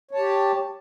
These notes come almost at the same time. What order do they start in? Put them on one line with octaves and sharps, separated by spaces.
C#5 A5 G4